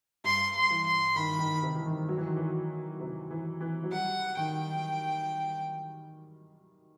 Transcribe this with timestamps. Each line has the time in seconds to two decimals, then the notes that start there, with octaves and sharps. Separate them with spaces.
0.24 G2 C6
0.56 C6
0.70 E3
0.86 C6
1.16 D#3 B5
1.39 D#3
1.63 C3
1.76 E3
1.86 D#3
2.09 F#3
2.18 E3
2.26 D#3
2.36 E3
3.00 C3
3.31 E3
3.61 E3
3.83 F#3
3.91 G3 F#5
4.37 D#3 G5